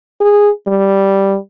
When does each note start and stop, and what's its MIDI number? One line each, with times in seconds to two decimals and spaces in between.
0.21 0.50 68
0.67 1.37 55